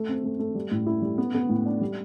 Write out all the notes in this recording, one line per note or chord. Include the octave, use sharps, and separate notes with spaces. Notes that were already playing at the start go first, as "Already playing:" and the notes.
Already playing: A3
C4
A3
A3
G3
A2
E4
G3
B3
B3
A2
D4
G3